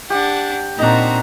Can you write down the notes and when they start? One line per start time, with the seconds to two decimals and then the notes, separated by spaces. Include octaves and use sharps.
0.10 D4 G4 F#5
0.79 A#2 C4 D4 D#4 F#4 A#5